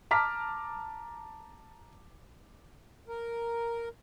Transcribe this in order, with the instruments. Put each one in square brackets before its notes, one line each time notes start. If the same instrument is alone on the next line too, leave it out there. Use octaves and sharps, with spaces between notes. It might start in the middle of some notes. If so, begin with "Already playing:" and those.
[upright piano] A5 A#5 D6 F6 B6
[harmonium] A#4